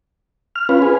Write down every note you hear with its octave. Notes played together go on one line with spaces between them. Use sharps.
F6
C#4 F4 B4
G#4